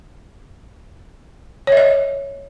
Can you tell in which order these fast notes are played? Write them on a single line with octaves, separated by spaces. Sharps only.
C#5 E5 D#5